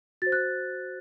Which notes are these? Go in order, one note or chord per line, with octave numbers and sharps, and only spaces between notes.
F#4 C5 A6
F#6